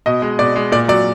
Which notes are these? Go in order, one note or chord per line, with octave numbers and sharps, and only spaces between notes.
B2 D#5
G#3
B2 D5
G#3
A#2 D5
F#3 D5